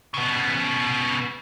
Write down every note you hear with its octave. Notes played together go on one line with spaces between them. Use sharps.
C#3 B3